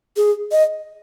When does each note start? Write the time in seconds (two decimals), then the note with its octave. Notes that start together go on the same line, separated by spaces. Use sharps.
0.16 G#4
0.52 D#5